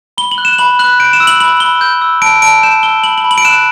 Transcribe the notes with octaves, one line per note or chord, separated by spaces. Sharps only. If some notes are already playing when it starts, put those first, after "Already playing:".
B5 G7
F#7
F#6
E7
B5 F#7
F#6 F#7
G6 D7
E7
E6
F#7
B5 F#7
B5 G7
G6
E6
A5 D7
A5 D7
G6 E7
E6 G7
B5 F#7
F#7
B5
F#7
D7
F#6 E7